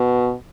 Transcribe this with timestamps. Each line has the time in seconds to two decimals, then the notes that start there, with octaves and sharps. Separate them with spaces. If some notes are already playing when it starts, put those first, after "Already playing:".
Already playing: B2